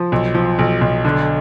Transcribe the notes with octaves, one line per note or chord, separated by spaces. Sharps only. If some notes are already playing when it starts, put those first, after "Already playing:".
Already playing: F3
B1
F3
B1
B1
D3